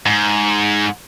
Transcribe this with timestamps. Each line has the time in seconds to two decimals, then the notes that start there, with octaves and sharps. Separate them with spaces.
0.06 G#2